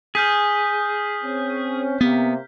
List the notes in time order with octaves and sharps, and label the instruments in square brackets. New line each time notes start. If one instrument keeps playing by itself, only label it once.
[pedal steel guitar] G#4 [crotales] F6 G6 B6
[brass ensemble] C4 C#4
[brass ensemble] C3 A#3 [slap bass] B3